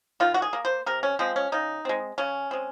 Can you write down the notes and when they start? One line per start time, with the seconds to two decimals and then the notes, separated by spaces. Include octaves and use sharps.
0.20 D#3 F4
0.34 F#4
0.42 G#4
0.53 A#3
0.65 C5
0.86 C3 A#4
1.03 C#4
1.19 F3 G#3 C4
1.36 C#4
1.52 C#3 D#4
1.85 G#3 C4
2.18 C#3 C#4
2.51 G#3 C4